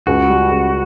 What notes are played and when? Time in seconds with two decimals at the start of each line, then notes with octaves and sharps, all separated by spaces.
0.07 C#2 F#4
0.29 G3
0.51 C#2